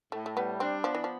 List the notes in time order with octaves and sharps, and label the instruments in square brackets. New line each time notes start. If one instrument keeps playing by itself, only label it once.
[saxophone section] A2 [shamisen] A3
[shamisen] A3
[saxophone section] G3 [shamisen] B3
[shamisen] C4 [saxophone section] D4
[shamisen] F3 [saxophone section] B3
[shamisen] E3
F3